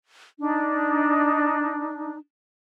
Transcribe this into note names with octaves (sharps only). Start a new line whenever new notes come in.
D4 D#4